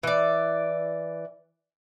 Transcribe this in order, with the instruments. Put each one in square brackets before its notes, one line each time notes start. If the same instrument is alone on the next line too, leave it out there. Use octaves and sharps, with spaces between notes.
[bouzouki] E3 D5